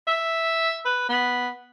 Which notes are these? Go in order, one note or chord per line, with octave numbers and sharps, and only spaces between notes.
E5
B4
B3